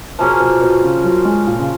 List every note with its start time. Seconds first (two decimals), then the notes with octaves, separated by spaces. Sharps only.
0.19 B2 F3 A#3 C#4 G#4
0.40 B2
0.61 B2
0.84 C#3
1.04 F#3 C#4 F4 A#4
1.25 G#3
1.47 A#2
1.59 C#3